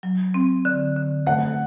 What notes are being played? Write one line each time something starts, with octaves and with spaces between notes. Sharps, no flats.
F#3
C4
D3
D3
A3 F#5